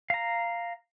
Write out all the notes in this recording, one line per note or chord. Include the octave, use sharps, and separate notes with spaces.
F5 A#5